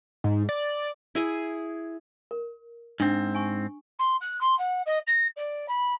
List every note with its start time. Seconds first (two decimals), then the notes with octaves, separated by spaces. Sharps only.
0.24 G#2
0.49 D5
1.15 E4 G#4 G#5
2.31 A#4
3.00 G#2 C4 D4
3.35 G#5 C#6
3.99 C6
4.21 F#6
4.40 C6
4.58 F#5
4.86 D#5
5.07 A#6
5.36 D5
5.68 B5